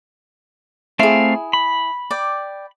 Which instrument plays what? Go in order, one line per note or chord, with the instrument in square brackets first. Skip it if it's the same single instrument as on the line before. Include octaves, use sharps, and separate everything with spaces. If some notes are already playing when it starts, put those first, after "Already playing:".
[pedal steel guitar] A3 C4 F5 [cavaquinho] E4 G#4
[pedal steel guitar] B5
[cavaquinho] D5 G5